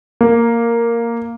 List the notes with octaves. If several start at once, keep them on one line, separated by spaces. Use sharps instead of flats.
A#3